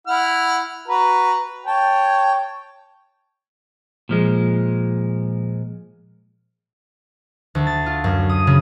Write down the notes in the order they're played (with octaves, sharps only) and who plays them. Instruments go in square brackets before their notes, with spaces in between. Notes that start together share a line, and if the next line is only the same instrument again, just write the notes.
[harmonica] E4 F#5 F6
F#4 B4 A#5
C#5 G5 A5
[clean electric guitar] A#2 F3 G#3
[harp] D2
A6
F4
F#2
D#6
C#3